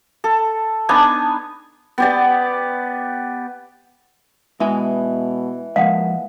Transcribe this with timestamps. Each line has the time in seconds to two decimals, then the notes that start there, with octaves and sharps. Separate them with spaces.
0.24 A4
0.89 B3 D4 D#4 G#5
1.98 B3 G4 D5
4.60 B2 E3 G#3 G#5
5.76 F3 G#3 A#3 F5 F#5